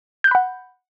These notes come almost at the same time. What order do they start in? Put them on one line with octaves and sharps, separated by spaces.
G6 F#6 B5 F#5